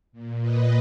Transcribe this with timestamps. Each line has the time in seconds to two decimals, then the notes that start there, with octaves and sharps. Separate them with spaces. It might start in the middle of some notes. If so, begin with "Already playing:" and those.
0.12 A#2
0.40 B4 D#5